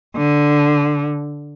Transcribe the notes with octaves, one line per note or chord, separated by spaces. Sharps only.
D3